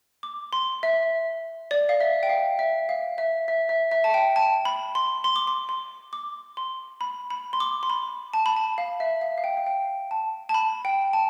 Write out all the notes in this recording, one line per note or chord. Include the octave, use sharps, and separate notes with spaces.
D6
C6
E5
D5
F5
E5
G5
F5
E5
F5
E5
E5
E5
E5
A5
G5
A5
B5
C6
C6
D6
C6
C6
D6
C6
B5
B5
C6
D6
C6
B5
A5
B5
A5
F5
E5
F5
F5
G5
F5
G5
A5
A5
B5
G5
A5